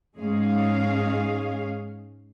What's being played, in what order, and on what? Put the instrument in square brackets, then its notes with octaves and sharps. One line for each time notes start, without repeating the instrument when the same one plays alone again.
[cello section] G#2 G#3 C#4 G#4 F5